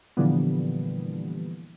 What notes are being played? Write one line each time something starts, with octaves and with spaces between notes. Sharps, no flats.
A#2 D3 E3 F3 G3 B3